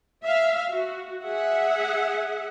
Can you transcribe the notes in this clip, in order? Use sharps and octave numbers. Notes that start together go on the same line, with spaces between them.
E5 F5
F#4
G#4 E5 F#5